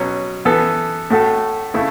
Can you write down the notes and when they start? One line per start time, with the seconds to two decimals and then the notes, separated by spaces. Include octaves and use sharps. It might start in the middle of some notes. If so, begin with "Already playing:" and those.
Already playing: B2 F#3 C#4
0.45 E3 B3 A4
1.10 A2 A3 F#4 A4
1.74 C#3 A3 E4 A4